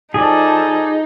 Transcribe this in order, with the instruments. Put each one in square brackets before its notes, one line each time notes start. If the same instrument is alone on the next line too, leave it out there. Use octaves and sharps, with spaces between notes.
[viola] F3 A4 [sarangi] D#4 [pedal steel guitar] G#4 D5 [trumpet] A5